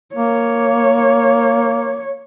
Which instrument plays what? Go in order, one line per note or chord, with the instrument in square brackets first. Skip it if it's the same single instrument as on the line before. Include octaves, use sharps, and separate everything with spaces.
[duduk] A#3 [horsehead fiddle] C#5